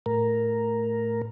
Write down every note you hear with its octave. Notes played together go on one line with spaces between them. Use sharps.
A2 A#4